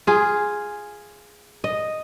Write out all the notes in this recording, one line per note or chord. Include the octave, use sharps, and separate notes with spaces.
F4 G#4
D#5